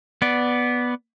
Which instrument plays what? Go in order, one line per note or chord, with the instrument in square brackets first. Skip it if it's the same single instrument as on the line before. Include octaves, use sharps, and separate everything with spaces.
[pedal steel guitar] B3 D5